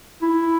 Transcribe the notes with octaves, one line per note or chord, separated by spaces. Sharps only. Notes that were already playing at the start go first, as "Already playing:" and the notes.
E4